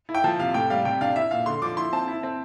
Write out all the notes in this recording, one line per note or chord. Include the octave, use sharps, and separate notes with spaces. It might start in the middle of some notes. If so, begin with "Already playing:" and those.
E4
G5
F3 A5
C3 F5
A2 G5
G3 F5
C3 G5
D4 F5
E4 E5
A#2 F5
D3 C6
F3 D6
E4 C6
C4 A5
E4
C4